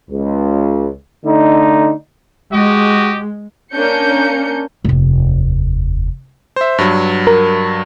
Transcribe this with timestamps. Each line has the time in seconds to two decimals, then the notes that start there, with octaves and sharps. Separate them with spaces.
0.11 C#2
1.26 D3 A3 D#4
2.53 G#3 F#4 G4 D#5
3.73 A#3 C#4 D4 G6 C#7
4.85 F1 D#2
6.56 C5 E5
6.78 G2 F#3
7.27 A#4